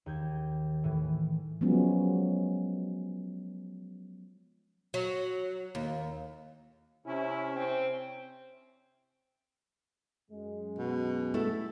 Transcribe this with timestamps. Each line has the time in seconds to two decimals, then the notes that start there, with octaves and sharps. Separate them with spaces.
0.06 D#2 G6 G#6
0.84 A2 E3
1.61 F3 F#3 G#3 B3 C#4
4.94 F#3
5.75 D#2
7.06 C3 C#4 E4
7.56 C4
10.30 F#2 G#3
10.78 B2
11.34 A3 E4 A4